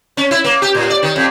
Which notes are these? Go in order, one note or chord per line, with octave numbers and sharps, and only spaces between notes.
C#4
E4
A#3
G4
A2
D5
D#3
F2